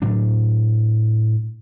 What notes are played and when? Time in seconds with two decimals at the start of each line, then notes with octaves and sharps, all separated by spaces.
0.02 A2 F#3 D4